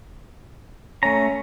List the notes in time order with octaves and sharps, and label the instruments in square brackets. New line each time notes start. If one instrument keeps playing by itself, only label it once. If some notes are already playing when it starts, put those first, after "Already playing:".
[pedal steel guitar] A3 A#5 [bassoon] C#4